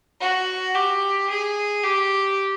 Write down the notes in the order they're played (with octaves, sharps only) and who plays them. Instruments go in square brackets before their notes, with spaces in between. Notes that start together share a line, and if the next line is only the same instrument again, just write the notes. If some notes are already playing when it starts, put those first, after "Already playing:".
[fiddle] F#4
G4
G#4
G4